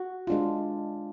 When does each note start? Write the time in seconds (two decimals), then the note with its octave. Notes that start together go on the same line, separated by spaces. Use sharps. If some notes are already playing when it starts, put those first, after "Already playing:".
Already playing: F#4
0.27 G#3 D4 F4